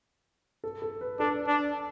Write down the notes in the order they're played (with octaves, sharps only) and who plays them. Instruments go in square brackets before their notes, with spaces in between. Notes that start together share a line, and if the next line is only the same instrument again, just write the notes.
[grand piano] A4
A4
B4
[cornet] D4 [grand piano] A4
[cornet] D4